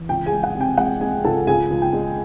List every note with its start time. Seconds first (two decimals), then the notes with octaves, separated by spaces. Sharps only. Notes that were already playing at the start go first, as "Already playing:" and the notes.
Already playing: E3
0.09 C#2 G5
0.26 G#4 G#5
0.33 G#3
0.43 F#5
0.55 C3
0.61 G5
0.78 G#3 F#5
1.01 G#3 G#4 G#5
1.25 C#2 A4 A5
1.47 C#2 G#4 G#5
1.71 C#2
1.82 G5
1.93 G#3